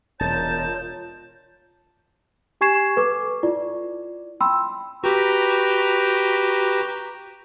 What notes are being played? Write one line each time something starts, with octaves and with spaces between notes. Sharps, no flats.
E1 F4 A#4 C#5 D#5 A5 G6
G4 G#5 C#6 G#6 C7 E7
A4 B4 C#6 D6
E4 F4 D5
G5 B5 C6 E6
F#4 G4 B4 G5 A#5